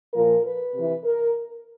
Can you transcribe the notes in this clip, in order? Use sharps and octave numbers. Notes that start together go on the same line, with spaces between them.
A#2 F3 A#4
B4
C3 E3
A#4